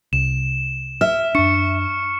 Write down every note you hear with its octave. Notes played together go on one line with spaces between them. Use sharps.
C2 E7
E5 F6
F#2 D4 C#6 C#7